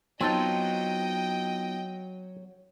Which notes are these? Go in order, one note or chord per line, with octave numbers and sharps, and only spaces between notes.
F#3 B3 C4 D#4 F4 D#5 G5 A5